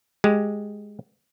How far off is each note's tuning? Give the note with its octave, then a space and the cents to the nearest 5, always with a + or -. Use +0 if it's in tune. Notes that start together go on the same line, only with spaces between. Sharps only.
G#3 +0 G4 +0